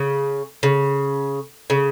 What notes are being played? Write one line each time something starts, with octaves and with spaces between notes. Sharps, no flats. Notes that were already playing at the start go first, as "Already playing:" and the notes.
Already playing: C#3
C#3
C#3